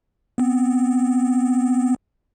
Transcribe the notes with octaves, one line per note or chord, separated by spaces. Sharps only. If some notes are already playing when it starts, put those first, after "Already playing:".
B3 C4